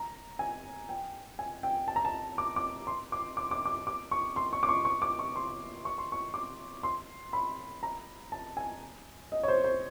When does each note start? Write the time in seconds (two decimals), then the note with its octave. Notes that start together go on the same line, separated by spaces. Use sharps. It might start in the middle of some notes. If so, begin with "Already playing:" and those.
Already playing: A#5
0.39 G#5
0.89 G5
1.39 G#5
1.63 G5
1.88 A5
1.96 A#5
2.05 A5
2.38 D6
2.56 D6
2.87 C6
3.12 D6
3.37 D6
3.51 D6
3.65 D6
3.87 D6
4.11 C#6
4.36 C6
4.53 C#6
4.63 D6
4.69 C#6
4.85 C#6
5.02 D6
5.19 C#6
5.36 C6
5.85 C#6
5.98 C6
6.12 C#6
6.34 D6
6.83 C6
7.33 B5
7.83 A#5
8.32 A5
8.57 G#5
9.32 D#5
9.43 C#5
9.48 C5
9.64 C5